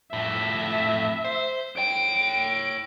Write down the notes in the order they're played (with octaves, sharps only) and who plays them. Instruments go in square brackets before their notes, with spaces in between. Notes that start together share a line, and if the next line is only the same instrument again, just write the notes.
[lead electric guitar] F2 A2 [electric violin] E5
[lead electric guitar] C5
[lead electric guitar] C#5 G5 [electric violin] D7